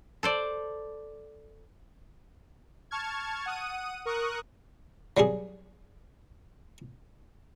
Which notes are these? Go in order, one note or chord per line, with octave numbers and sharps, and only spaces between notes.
A4 C5 D5
A5 C#6 F6 G#6
F#5 D#6 D#7
A#4 C#6 D#6 F#6
F#3 G3 B3 G#4